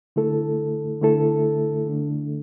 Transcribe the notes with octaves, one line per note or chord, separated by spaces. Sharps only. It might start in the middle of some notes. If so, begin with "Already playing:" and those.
D3 A3 E4 A4
D3 A3 E4 A4
D3 A3 D4